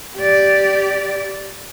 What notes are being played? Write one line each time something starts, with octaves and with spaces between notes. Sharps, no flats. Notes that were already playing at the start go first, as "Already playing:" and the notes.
G4 D5